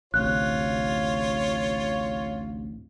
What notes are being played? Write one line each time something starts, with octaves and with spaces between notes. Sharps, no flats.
A1 D2 C3 F4 C#5 F#6